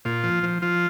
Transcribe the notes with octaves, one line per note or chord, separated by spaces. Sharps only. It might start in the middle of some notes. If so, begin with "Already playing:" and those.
A#2 F4
F3
F3
F3 F4